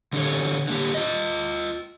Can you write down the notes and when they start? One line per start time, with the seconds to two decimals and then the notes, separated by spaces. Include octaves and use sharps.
0.13 D3 D4 G4 A4 C#5
0.68 D3 A#3 G4
0.94 F4 D#5